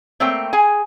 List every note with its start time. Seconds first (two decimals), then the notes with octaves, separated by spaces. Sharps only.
0.20 A3 A#3 C4 C#5 G5
0.53 G#4 G#5